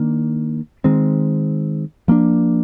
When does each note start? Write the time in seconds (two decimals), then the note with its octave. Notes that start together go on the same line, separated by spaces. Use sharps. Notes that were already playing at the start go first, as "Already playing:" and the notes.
Already playing: D#3 A#3 D4
0.84 D#3 G#3 C4
2.08 F3 A#3 D4